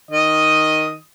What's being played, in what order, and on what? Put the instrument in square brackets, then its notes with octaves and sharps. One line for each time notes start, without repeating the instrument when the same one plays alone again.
[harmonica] D#3 D#5 D#6